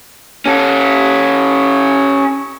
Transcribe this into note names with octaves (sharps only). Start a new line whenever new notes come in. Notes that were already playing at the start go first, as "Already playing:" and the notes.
C#4 A4